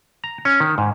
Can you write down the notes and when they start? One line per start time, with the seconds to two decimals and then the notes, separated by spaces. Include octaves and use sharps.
0.24 A#5
0.45 C#4
0.60 D#3
0.78 G#2